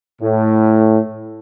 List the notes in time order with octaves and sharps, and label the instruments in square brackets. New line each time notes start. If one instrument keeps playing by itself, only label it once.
[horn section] A2